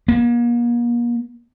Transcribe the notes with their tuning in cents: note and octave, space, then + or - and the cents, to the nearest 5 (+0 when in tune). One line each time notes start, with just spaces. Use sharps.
A#3 +40